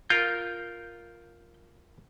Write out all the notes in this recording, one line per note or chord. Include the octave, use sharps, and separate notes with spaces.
F4 A#4 G6